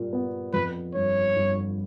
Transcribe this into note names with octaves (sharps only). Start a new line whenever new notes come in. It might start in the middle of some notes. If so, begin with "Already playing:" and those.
Already playing: A#2 G3
B3
F2 B4
G1 C#5
G1